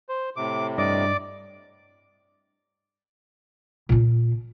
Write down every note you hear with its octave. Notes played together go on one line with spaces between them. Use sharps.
C5
A2 C3 D6
G2 D5 D#5 D6
A#2 F4